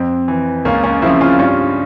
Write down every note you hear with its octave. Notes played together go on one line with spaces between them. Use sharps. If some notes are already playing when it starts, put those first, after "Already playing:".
Already playing: F2 C4
E3
C#2 A#3 C#4
A#3 C#4
C#3 F3 C4 E4
C#4 F4
G2 C#4 F4